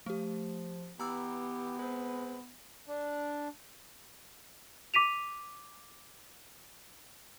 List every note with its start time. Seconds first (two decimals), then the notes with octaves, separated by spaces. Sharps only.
0.06 F3 A3 G4
1.00 E3 B3 G4 A#5 E6
1.79 G#3 C4 B4
2.86 D4
4.94 D6 B6 D#7 F7